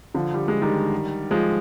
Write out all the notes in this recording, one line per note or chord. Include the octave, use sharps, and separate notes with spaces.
D3 F3
G3
G#3
D#3 G3
F3 G#3